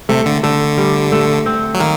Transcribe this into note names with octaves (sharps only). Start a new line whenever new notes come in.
C3 A3
D3
D3 A3
G3
A3
C4
F#3
D#3 A#3